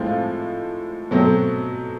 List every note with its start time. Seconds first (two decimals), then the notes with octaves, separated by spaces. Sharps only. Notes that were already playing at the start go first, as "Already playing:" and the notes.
Already playing: A2 F3 G#3 C4 F4
1.11 B2 F#3 A3 C4